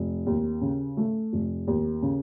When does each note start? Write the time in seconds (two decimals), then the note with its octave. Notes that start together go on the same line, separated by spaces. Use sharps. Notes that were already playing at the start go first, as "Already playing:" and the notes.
Already playing: F1
0.26 D#2
0.61 C#3
0.97 A3
1.33 F1
1.67 D#2
2.02 C#3